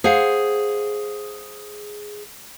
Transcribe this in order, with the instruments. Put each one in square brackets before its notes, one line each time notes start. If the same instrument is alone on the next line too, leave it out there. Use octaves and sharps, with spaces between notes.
[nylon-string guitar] G#4 C5 F5 F#5